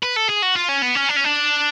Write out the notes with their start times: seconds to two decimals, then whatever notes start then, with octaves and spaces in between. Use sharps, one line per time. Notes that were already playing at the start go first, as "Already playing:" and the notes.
0.03 B4
0.16 A4
0.29 G#4
0.43 F#4
0.56 F4
0.69 C#4
0.82 B3
0.95 C#4
1.09 D4
1.16 C#4
1.24 D4